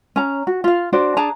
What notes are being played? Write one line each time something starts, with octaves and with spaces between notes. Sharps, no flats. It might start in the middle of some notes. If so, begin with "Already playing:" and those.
C#4 A#5
F#4
F4 F5
D4 F#4 C5 D5
D4 G#4 A5 A#5